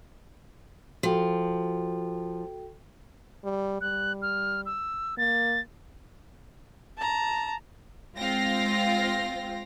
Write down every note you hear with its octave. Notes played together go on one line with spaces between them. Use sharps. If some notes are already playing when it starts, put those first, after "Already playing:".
F3 F#4 A4 G5
G3
G3 F#6
F6
E6
A#3 A6
A5 A#5
G#3 C4 F4 F5 G5 A#6